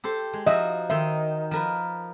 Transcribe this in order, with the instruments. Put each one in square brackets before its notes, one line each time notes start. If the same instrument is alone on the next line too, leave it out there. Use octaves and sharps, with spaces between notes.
[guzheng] G4 A4 C5
G#3
[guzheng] F3 D#4 F#4 [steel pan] D#5 E5
[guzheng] D#3 D#4 C6 [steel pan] E5
[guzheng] F3 A#4 B4